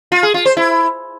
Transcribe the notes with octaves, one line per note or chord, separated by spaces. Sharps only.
F4
G#4
F4
C5
E4